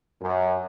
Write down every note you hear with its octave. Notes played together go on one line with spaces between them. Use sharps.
F#2